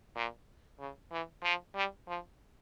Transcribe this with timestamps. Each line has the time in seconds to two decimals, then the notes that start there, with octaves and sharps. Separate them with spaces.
0.16 A#2
0.79 C#3
1.12 E3
1.43 F3
1.75 G3
2.08 F3